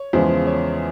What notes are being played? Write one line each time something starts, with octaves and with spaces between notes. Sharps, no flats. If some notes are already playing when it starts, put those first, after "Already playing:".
Already playing: C#5
E2 C#3 F3 G#3
C#5